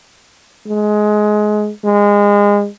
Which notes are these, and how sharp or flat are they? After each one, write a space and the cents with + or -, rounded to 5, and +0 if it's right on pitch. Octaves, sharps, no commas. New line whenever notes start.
G#3 +20
G#3 -25